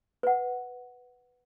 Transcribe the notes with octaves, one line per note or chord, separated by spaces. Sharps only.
B4 F#5